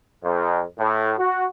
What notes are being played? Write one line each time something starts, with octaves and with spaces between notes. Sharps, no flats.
F2
A2
F#4